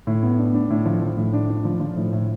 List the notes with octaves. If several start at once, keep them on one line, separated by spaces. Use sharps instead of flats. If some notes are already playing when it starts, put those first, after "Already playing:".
A2
B3
D4
D4
A2
F3
F3
A2
D4
D4
F3
F3
A2
A2